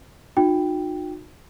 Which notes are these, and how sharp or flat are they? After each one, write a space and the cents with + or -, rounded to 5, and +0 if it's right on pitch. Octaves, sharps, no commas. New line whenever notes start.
D#4 -30 F#4 -45 G5 +0